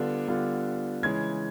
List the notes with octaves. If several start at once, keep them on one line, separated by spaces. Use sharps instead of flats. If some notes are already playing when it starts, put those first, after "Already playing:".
Already playing: D3 G3 B3 D4 F4
D3 G3 B3 D4 F4
C#3 E3 G#3 G#6